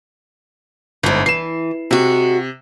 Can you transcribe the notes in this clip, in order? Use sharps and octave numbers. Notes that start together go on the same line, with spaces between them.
G1 G#2 D3 E4
E3 C7 E7
C3 G#3 F#4